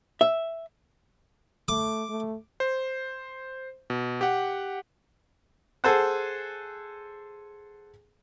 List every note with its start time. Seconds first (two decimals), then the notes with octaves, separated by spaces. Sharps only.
0.21 E5
1.68 A3 D6
2.09 A3
2.60 C5
3.90 B2
4.21 G4 F#5
5.84 G#4 A4 C5 F#5